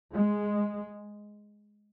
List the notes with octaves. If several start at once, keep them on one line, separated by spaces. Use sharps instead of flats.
G#3